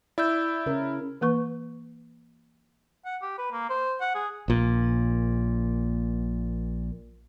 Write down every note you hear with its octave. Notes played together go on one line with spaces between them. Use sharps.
E4 D5 E6 G6
C#3 C#4 A#4
E3 A#3 B4 C#6
F#5
G4
B4
A#3
C5
F#5
G#4
A#1 A#2